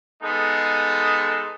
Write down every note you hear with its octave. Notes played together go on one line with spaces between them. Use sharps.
G#3 B3 D#4 A4